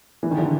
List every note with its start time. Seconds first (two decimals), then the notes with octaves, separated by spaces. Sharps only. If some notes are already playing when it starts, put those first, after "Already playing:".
0.23 E3
0.31 D#3
0.38 D3 E3